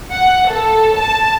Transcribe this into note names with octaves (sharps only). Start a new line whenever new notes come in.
F#5
A4
A5